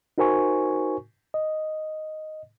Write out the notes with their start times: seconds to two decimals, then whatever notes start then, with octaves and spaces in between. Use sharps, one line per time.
0.18 D#4 F#4 A#4 C5 G#5 C#6
1.34 D#5